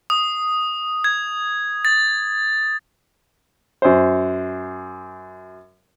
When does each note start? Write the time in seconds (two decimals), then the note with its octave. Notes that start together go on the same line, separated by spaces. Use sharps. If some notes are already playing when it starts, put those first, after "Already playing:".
0.10 D#6
1.04 G#6
1.85 A6
3.82 F#2 C5